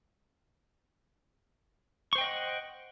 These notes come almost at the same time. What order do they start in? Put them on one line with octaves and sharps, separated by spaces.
C#6 C5 G5 D#5 F#5